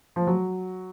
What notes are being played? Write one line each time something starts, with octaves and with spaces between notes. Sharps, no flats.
F3
F#3